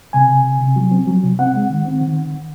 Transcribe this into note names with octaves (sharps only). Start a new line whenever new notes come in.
C3 G#5
C3
C3
C3
F#3
C4
F#3
C3
C4 F#5
G#3
D#3
C4
D#3